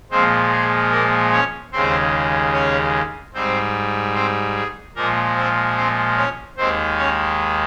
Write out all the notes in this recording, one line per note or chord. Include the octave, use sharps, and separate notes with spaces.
A#2 F3 G#3 C4 C5
G#4
A#3 A#4
C#4 C#5
D#2 C#3 G#3 C4 C5
C#4 C#5
G#2 G3 C4 C5
C4 C5
G#4
A#2 F3 G#3 A#3 A#4
C4 C5
C4 C5
C#4 C#5
D#2 D#3 G#3 C4 C5
C#4 C#5